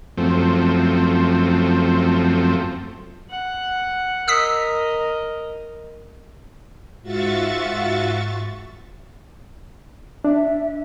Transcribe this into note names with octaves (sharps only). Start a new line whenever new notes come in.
F#2 F3 A3 C4
F#5
A#4 D#5 D#6 E6 B6
G#2 F4 F#4 E5 C#6 A6
D4 E5